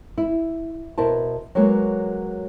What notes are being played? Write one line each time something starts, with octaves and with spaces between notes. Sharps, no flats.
E4
B2 E4 A#4 C5 A5
F#3 G#3 A#3 B3 F#4 C#5